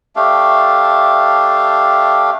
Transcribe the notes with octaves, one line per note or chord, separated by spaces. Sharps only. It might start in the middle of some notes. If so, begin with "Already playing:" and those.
A3 D4 G4 F5